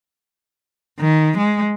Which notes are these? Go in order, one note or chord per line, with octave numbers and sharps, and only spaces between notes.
D#3
G#3